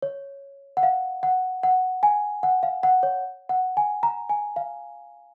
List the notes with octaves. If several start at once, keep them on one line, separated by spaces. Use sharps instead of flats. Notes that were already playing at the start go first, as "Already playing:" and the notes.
C#5
F#5
F5
F#5
F#5
G#5
F#5
F5
F#5
C#5
F#5
G#5
A#5
G#5
F5